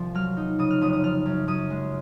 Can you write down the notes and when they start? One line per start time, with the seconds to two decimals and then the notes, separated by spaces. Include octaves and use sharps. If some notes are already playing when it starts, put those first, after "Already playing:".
Already playing: C2 F3
0.15 F#3 F6
0.37 D#4
0.59 C#3 D#6
0.71 F6
0.81 F1 D#6
0.93 D#6
1.03 F3 F6
1.26 F#2
1.48 F#2 D#6
1.70 G#3